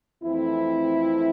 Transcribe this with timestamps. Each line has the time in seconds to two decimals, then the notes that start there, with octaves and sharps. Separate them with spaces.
0.23 F2 E3 A3 C4 E4